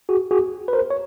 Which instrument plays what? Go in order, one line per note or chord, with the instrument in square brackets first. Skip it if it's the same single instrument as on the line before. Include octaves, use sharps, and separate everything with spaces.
[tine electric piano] F#4 G#4
F#4 G#4
B4
A#4 C5
C#5